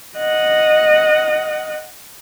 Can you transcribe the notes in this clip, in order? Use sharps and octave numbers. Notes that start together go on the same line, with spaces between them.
D#5 F#5